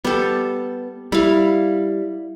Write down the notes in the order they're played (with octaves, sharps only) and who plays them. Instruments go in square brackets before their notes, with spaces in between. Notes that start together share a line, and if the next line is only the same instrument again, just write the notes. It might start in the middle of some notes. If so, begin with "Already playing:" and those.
[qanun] G3 A4 [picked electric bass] B3
[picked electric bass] G3 [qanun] E4 F5